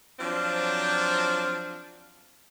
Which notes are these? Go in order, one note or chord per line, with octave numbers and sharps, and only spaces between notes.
F3 F#3 C4 D4